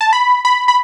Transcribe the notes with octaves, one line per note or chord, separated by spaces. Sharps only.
A5
B5
B5
B5